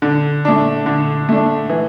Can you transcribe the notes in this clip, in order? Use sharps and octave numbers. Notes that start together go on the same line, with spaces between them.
D3
A3 D4
D3
A3 D4
E3